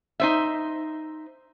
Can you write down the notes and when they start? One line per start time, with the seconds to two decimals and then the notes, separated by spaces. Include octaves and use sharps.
0.20 D#4 C5 E5